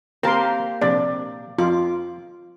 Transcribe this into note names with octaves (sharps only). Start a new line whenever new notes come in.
A#3 C4 G4 A#4 A5 C6
A#1 C3 D4 D5
F2 F4 D6